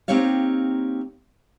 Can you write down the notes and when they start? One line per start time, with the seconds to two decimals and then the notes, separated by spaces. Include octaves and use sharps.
0.08 A#3 C4 D#4 G4 C#5 F5